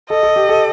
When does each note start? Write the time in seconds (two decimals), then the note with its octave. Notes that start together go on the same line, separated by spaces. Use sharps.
0.10 A4 D#5
0.23 A4
0.36 G4
0.49 A4